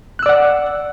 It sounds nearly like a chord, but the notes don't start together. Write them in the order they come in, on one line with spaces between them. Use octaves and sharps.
F#6 E6 D5 F#5